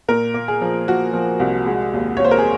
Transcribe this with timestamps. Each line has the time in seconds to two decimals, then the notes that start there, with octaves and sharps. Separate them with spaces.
0.08 A#2 A#4
0.34 A#3
0.48 G#4
0.61 F3
0.88 F3 F#4
1.13 F3
1.40 C2
1.66 G#3
1.93 D#2
2.17 C#5
2.20 D#2 C5
2.31 A#4
2.38 G#4